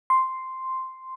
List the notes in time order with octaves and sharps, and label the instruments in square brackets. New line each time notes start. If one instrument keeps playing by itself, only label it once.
[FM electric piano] C6